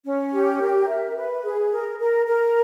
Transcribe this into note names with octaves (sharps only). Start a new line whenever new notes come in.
C#4
G4
A#4
E5
B4
G#4
A#4
A#4
A#4